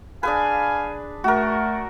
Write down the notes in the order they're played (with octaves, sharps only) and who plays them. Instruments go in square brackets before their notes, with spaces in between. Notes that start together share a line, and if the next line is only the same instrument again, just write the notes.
[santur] D4 G#4 B4 [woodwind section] F5 G#5
[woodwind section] A3 [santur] F#4 A#4